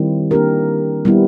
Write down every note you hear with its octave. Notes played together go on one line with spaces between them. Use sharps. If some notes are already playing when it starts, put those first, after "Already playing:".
Already playing: D#3 G3 C4 E4
A#3 D4 G4 A#4
G3 B3 E4